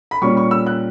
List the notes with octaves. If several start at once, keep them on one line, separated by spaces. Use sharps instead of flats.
B5
A#2 G3 C#4 C#6
C#6
E6
F#6